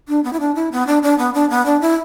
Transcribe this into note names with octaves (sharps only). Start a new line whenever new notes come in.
D4
B3
E4
D4
E4
B3
D4
D4
B3
D4
B3
D4
E4